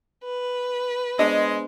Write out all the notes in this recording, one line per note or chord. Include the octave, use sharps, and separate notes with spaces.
B4
G#3 B3 D4 C5 D#5